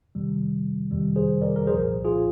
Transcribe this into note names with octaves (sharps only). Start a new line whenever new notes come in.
F2 C3 D#3 G3
F2 C3 D#3 G3
G#4 C5
A#4 D5
A#4
C2 A#2 F3 G#4 C5
F4 G#4